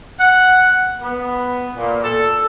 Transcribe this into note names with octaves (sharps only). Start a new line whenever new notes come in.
F#5
B3
A#2
A4